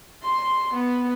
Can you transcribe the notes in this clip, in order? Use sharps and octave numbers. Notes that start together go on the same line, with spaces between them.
C6
B3